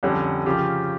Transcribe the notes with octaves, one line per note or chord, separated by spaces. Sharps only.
F2 D3 G3 C#4
C#3 F3 C#4 G4